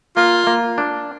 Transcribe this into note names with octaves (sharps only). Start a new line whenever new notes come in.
A#3 F4
A#3
D4